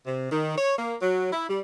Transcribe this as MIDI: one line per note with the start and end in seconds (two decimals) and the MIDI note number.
0.06 0.29 48
0.31 0.54 51
0.58 0.74 73
0.78 0.95 58
1.02 1.30 54
1.32 1.46 64
1.49 1.60 55